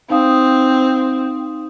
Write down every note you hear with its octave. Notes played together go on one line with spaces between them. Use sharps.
C4 D#4 F5 D#6